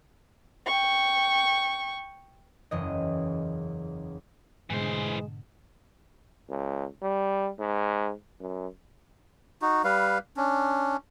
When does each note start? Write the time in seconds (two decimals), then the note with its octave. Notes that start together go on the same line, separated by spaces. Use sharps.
0.66 G5 C#6
2.71 F#1 E2 E3 D#5
4.70 G#2 B2 D3 E3 G#3 C5
6.49 C#2
7.02 G3
7.60 G#2
8.40 F#2
9.62 D#4 F#4
9.84 G3 B4 F5
10.37 C#4 D4